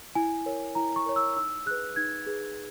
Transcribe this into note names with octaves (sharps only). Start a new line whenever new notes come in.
E4 G#5
A#4 C#5
E4 A#5
C#6
A#4 C#5
E6
D#4 E6
G#4 B4 F#6
D#4 G#6
G#4 B4